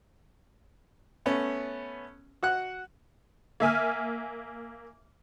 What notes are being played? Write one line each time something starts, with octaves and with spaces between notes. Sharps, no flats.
A3 B3 C#4
F#4 F#5 F#6
A#3 E5 G#5 F6